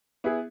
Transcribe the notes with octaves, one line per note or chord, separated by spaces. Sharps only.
B3 E4 G#4